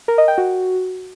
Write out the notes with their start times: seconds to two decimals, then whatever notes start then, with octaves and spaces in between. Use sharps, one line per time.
0.08 A#4
0.18 D#5
0.28 G5
0.38 F#4